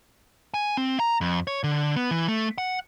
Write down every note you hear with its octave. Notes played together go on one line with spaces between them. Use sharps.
G#5
C4
A#5
F2
C#5
D3
B3
E3
A3
F#5